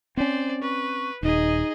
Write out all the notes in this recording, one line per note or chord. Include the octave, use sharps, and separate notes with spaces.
C4 C#4 C5 D5
B4 C#6
D#1 D#4 G#4 D#5